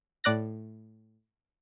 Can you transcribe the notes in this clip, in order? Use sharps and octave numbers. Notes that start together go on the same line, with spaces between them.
A2 D5 F#6 A#6